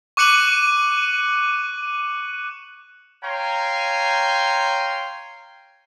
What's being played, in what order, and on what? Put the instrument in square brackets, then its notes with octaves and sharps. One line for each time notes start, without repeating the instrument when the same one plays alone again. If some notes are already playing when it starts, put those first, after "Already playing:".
[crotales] C#6 D6 F#6 C#7 D#7 F#7
[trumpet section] C#5 F5 G5 G#5 A#5 C6